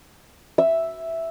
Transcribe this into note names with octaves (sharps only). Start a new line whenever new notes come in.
E5